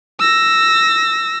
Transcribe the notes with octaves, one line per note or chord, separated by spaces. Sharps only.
E6 A#6